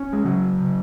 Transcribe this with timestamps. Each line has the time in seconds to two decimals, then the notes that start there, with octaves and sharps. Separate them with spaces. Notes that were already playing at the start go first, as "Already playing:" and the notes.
Already playing: C#4
0.13 G#3
0.24 C#3 F#3
0.60 C#3